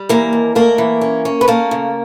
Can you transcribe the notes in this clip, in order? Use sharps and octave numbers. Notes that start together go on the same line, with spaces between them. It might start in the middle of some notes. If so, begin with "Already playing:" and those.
Already playing: G3
E3 A#3 A#4
D#2
A3 A#3 A#4
E3
C#4
C#4
B4
A3 A#3 A#4
C#3